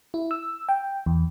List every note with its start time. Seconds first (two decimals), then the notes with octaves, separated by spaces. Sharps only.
0.14 E4
0.31 E6
0.69 G5
1.06 E2